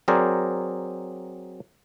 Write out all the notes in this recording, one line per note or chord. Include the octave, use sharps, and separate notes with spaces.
F#3 C4 G#4 A#4 C5 D5